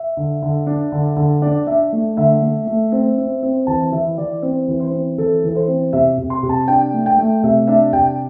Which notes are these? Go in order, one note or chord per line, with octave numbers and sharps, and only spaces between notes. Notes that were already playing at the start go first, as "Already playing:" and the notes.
Already playing: E5
D3
D3
D4
D3
D3
D4 D5
D4 E5
A3
D3 E5
A3
A3
C4
C4
C4
E3 A5
E3 E5
E3 D5
C4
E3
C5
C4
E3 A4
E3 A4
C5
C4
C3 E5
C3
C6
C3
A5
D4 G5
A3
G5
A3
C3 E5
D4 E5
C3 G5